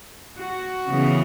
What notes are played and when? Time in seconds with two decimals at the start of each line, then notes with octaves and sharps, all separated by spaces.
0.39 F#4
0.88 C#3 E3 B3